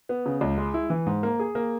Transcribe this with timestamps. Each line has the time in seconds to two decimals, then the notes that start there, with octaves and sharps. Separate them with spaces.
0.09 B3
0.26 C#3
0.41 C#2
0.58 G#3
0.74 E4
0.90 E3
1.06 G#2
1.23 A#3
1.39 G#4
1.55 A#3